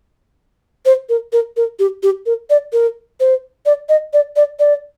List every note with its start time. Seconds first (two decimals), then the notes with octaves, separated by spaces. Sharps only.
0.86 C5
1.09 A#4
1.33 A#4
1.57 A#4
1.79 G4
2.03 G4
2.26 A#4
2.50 D5
2.73 A#4
3.20 C5
3.66 D5
3.89 D#5
4.13 D5
4.36 D5
4.59 D5